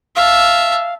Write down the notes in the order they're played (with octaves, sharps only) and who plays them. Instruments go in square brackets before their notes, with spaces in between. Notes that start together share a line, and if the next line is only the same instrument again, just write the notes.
[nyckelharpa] E5 A5 [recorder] F5